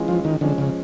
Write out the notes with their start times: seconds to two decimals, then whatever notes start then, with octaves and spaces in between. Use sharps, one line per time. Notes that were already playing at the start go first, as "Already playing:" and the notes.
Already playing: E3 G#3 C#4 F4
0.08 F3
0.25 D#3
0.41 D3 F3 G#3 C#4
0.58 C#3